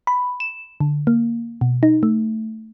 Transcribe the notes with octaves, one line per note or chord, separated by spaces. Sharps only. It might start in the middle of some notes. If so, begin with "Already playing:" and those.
B5
E7
D3
A#3
B2
D#4
A3